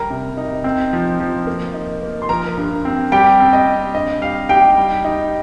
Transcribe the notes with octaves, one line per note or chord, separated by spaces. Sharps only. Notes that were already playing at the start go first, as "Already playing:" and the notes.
Already playing: G3 A#4 A#5
C3
D#4
C4
F3
F3
A#3
D#4
A#3
C6
F3 A#4 A#5
G2
C4
G3 G4 G5
C4
D#5
C4
G2 D#5
G3 F5
D#4 G4 G5
G3
D#4